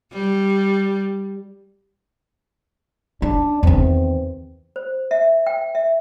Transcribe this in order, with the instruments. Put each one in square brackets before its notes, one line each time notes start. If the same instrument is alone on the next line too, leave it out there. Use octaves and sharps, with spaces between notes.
[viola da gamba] G3
[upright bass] C#4 [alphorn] D4
[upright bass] E2 D#3 [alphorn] C4
[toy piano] C5
E5
G5
E5